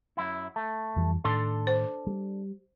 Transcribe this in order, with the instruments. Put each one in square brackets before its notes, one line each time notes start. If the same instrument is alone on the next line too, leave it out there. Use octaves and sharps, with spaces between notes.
[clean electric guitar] F#2 E4
A3
[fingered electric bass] F2 E3 G3
[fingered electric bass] A2 D#3 [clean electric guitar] D4 A4 C6
[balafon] C5
[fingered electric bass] G3